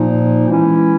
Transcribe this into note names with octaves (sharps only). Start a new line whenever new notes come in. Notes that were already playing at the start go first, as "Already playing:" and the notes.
Already playing: A#2 F3 A#3 D#4
E3 G#3 C#4 E4